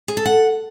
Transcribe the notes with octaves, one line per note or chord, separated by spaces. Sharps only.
G#4
A4
F#5